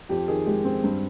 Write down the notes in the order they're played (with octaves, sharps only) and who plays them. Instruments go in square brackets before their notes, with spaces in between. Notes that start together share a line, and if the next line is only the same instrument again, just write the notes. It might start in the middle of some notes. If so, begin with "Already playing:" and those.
[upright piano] F2 G4
D#3 G#4
G#3 G4
C4
G2